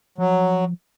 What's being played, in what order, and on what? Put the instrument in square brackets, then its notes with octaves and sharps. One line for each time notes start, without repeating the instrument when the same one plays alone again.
[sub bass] F3 [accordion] F#3